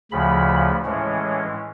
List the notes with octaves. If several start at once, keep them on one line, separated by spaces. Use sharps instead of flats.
D2 C#3 F3 B5
A2 E3 G#3 C#4